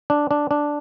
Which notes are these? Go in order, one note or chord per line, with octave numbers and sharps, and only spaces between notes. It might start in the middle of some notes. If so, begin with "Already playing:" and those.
D4
D4
D4